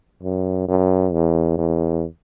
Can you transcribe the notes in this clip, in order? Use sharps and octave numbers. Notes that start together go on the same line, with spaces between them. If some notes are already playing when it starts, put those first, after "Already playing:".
F#2
F#2
E2
E2